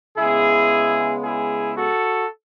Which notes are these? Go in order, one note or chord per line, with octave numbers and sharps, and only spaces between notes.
C#3 G#3 B3 E4 G#4
E4 G#4
F#4 A4